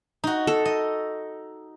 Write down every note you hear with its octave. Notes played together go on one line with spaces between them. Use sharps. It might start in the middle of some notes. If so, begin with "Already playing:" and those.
D#4 F#4
A4
D#5